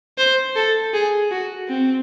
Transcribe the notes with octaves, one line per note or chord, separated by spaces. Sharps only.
C5
A4
G#4
F#4
C4